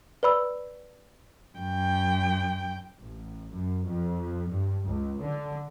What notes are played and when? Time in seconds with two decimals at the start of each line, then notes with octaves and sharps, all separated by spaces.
0.23 B4 D5 B5 E6
1.58 F#2 G5
3.01 A1
3.52 F#2
3.88 F2
4.50 G2
4.85 C#2
5.22 D3